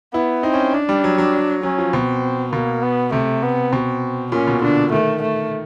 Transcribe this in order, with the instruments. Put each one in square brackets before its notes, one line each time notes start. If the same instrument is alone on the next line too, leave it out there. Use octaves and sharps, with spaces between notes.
[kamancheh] B3 [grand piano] E4
[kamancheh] C4 [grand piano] D#4
[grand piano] C#4
[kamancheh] D4
[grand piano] G3
F#3
F#3
[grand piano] F#3 [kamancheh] C#4
[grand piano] F3
[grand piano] B2 [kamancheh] C4
[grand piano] B2 [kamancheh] A#3
[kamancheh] B3
[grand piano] C3 [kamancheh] A3
[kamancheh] B3
[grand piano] B2 [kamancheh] C4
[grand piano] A#2 [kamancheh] C#4
[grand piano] B2
[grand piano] D3 [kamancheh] D4
[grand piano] D#3 [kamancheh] A3
[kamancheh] A3